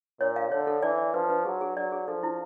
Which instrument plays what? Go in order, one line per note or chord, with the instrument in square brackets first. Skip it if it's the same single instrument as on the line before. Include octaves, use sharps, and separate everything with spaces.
[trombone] A#2 [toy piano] C#5
[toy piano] F5
[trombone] D3 [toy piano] C#5
[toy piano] A4
[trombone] E3 [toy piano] D5
[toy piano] D5
[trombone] F3 [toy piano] B4
[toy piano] B4
[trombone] F#3 [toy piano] G#4
[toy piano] G#4
[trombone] F#3 [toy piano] D5
[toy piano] G#4
[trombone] F3 [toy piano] A4
[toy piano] E4